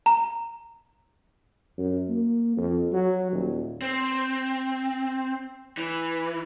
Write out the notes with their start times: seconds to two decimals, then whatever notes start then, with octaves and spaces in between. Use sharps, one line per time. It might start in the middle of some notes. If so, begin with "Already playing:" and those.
0.06 A#5
1.78 F#2
2.09 A#3
2.57 F2
2.92 F#3
3.32 D#1
3.82 C4
5.77 E3